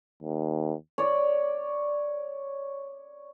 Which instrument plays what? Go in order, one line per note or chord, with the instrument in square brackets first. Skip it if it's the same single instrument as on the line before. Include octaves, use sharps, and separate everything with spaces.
[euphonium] D#2
[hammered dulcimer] C#5 D5